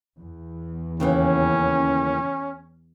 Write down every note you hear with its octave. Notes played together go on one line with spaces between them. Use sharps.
E2
D#2 C#3 E3 C#4